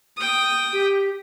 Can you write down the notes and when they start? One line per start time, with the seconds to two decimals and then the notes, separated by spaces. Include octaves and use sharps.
0.17 G5 D#6
0.72 G4